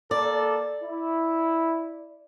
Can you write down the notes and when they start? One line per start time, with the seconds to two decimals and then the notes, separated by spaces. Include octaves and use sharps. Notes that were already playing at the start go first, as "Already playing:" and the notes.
0.11 A#3 A4 D5
0.83 E4